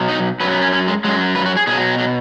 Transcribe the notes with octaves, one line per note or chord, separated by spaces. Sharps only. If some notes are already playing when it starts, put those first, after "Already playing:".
Already playing: B2 F#3
D#4
F#2 F#3 B4
B3
C#4
C#4
G#3
F#2 F#3 G#3
B4
F#4
G#4
B2 F#3 G#4
F#3